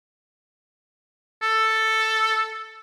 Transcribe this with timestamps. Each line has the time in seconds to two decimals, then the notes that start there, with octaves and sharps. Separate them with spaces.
1.42 A4